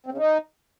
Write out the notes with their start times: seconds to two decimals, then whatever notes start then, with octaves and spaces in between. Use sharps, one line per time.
0.06 C4
0.12 C#3
0.18 D#4